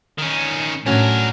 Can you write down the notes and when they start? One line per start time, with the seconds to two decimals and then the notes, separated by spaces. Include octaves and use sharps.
0.18 D#3 C#4
0.86 A2 F#3 C#4 D4 A#4